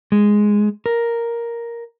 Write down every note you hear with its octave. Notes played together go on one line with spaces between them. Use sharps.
G#3
A#4